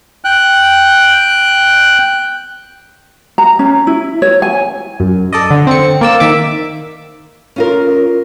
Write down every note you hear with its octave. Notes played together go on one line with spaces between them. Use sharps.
G5 F#6
A#5
C#4
E4
C#5
G#5
F#2
A4 D5 D#5
D3
C4 C#7
A#3 D5 E6
D#3 E5 D6
C#4 F4 A#4